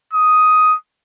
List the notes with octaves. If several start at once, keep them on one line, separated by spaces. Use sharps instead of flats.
D#6